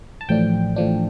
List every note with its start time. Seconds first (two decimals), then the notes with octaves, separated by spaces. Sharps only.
0.21 A5
0.29 A1 A2 F3 D4 G5
0.76 A1 A2 F3 D4